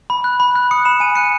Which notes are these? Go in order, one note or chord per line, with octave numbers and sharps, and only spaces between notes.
B5
F#6
B5
F#6
D#6 C#7
B5 E7
G#5 D#7
F#6 C#7